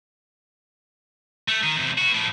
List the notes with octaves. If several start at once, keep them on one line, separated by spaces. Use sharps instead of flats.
A3
D#3
E2 C3
B3 F#4
A2 F3